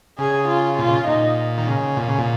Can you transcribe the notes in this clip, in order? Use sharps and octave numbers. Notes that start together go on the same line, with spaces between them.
C#3 G#4
F4
A#2 F4
C#3
A#2 D#4
D#3
C#3
A#2
C#3
A#2